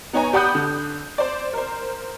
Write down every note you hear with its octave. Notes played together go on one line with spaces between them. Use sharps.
B3 D#4 C#5 G#5 A#5
G4 D5 F#5 B5 D#6 G6
D3
C5 D5
A#4 C5